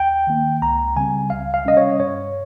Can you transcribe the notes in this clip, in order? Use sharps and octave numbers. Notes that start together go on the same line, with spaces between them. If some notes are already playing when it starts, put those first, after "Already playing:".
Already playing: D#2 G5
D#3 A#3
C#2 A#5
C#3 G3 C4 G#5
C#2 F5
F5
C3 G3 C#4 D#5
C#5
G2 C#5